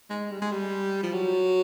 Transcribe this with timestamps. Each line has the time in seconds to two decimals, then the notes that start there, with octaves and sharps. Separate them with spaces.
0.10 G#3
0.31 G3
0.42 G#3
0.52 G3
1.03 F3
1.13 F#3